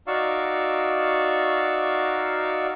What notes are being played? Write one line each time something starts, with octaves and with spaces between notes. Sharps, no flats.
D#4 F#4 D5 F5 C#6 E6